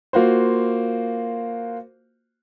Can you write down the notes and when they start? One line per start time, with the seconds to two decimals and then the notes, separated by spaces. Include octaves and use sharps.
0.13 A#3 F4 F#4 C5